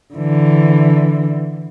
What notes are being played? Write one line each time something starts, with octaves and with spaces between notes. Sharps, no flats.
D3 E3